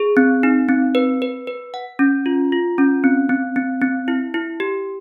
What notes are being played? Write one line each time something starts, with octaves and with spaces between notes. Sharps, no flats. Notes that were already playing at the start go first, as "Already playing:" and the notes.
Already playing: G#4
C4
D#4
C4
B4
B4
B4
F#5
C#4
F4
F4
C#4
C4
C4
C4
C4
E4
E4
G4